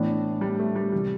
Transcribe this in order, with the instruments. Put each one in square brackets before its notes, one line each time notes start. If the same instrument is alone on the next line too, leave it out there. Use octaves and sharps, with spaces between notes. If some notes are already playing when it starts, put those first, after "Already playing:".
Already playing: [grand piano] A2 E3 B3 D4
[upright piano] G3
A3
G3
[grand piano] C3 E3 A3 C4 [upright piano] G3